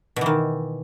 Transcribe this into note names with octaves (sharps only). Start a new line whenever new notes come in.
B2 D#3 E3